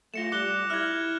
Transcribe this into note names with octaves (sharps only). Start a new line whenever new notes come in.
A3 F4 A#6 C#7 E7
G3 D6 F#6 G7
E4 F6 G#6